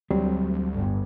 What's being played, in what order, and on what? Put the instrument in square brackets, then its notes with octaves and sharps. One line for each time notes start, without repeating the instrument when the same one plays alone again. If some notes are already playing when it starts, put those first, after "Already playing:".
[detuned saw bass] D2 [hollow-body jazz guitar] F#3 C4 [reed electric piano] G3
[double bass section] G1 G2